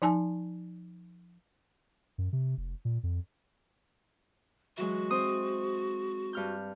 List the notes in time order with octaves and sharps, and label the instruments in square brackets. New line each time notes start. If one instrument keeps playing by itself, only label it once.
[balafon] F3 D#4 G#5 A5
[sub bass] F#2
C3
F1
A#2
F2
[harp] E3 F#3 G#3 [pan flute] F#4
[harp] C4 C5 D#6
G2 F6 G6